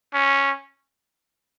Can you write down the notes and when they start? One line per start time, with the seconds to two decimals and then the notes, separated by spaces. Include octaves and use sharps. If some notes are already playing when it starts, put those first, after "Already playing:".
0.14 C#4